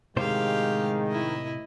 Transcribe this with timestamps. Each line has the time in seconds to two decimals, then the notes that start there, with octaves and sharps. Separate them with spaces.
0.17 A2 C3 D#3 G#3 G4 C5 F5
1.07 E4 D#5